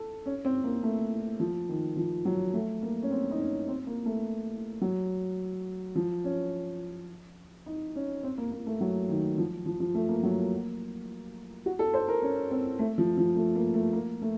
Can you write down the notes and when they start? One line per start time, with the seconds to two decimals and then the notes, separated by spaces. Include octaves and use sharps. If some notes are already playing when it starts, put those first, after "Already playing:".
Already playing: A4
0.26 C#4
0.45 C4
0.64 A#3
0.83 A3
1.40 F3
1.69 D#3
1.97 F3
2.25 F#3
2.53 A3
2.82 A#3
3.03 C#4
3.11 C4
3.31 D#4
3.39 C#4
3.68 C4
3.87 A#3
4.06 A3
4.81 F#3
5.95 F3
6.24 C#4
7.66 D#4
7.96 C#4
8.23 C4
8.38 A#3
8.52 A#3
8.66 A3
8.81 F#3
9.09 D#3
9.38 F3
9.66 F3
9.80 F3
9.94 A3
10.09 A#3
10.23 F#3
10.37 A#3
11.66 F#4
11.79 A4
11.94 C5
12.08 A#4
12.22 C#4
12.51 C4
12.79 A3
12.98 F3
13.17 F3
13.36 A3
13.55 A#3
13.74 A3
13.93 A#3
14.22 A3